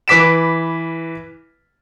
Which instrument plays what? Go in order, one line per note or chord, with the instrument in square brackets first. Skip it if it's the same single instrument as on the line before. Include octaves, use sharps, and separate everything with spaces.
[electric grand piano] E3 B4 D6 B6 D7 E7